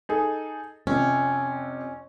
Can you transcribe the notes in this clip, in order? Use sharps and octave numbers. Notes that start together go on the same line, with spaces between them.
D#4 G#4 A4
F2 C3 C#4